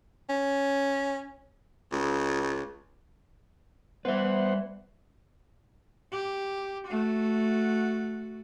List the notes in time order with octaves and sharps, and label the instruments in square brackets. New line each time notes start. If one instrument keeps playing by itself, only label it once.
[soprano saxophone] C#4
[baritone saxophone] C#2
[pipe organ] G3 [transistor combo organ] B3 C5 F#5 [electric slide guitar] B4 E5
[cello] G4
A3 F#4